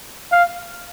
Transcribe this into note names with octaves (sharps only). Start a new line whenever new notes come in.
F5